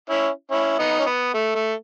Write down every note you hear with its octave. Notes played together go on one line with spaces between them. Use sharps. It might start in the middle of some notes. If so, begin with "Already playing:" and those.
C#4 E4
C#4 E4
B3 D#4
C#4
B3
A3
A3